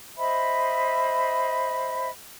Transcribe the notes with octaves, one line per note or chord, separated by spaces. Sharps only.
C5 D#5 E5 B5